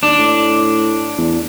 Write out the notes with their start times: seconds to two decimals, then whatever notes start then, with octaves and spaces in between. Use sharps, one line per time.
0.03 D#2 D4
0.18 A2
1.18 E2